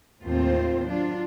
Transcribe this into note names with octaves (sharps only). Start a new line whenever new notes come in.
D#2 A2 A3 C4 F4 C5
F#3 D4 F4